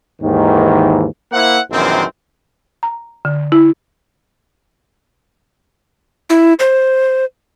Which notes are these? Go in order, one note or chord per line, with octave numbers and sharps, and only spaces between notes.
D#2 G#2 D#3 E3
A#3 E4 C5 E5 F#5
A#1 F#2 D#3 E3 C4
A#5
D3
E4
E4
C5